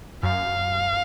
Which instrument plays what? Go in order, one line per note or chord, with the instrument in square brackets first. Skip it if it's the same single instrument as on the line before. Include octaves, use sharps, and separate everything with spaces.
[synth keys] F#2 [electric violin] F5